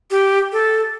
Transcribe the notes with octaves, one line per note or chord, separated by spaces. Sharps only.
G4
A4